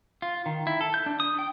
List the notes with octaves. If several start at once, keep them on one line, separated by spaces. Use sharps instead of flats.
F4
D#3
E4
A4
G6
D4
D#6
G5